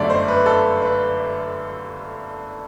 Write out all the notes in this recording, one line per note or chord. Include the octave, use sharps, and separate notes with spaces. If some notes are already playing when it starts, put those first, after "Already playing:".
Already playing: G1 F#2 D3 A3 D5 E5
C5
B4
A4
B4